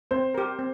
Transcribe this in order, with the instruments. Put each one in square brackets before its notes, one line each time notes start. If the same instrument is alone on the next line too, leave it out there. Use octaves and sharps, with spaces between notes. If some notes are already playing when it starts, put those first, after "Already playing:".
[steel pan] C4 [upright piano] C5
[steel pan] G4 A#4
C4